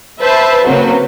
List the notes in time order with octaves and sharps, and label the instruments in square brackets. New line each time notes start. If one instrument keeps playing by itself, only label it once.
[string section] B4 C5 E5 A5
C#3 F#3 A#3 C4 B4